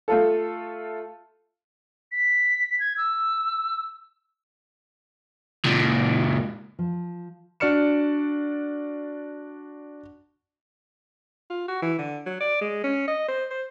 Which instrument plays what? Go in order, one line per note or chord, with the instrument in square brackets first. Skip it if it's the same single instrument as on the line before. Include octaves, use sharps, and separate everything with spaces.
[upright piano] A3 F4 A4
[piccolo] B6
G#6
E6
[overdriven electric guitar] C#2 A#2
[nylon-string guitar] F3
[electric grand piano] D4 F#4 D5 F6 C#7 E7
[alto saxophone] F4
F#4
E3
D3
F#3
D5
G#3
C#4
D#5
C5
C5